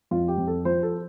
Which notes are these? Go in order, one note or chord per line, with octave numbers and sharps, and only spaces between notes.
F2 F4
G4
F2
A4
F3 C5
A4